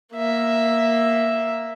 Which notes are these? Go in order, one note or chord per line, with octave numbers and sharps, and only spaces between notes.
A#3 E5